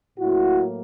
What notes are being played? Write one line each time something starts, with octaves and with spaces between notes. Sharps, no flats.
A2 F#3 A#3 E4 F#4